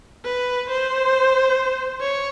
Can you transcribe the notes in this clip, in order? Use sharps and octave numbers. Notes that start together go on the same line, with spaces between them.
B4
C5
C#5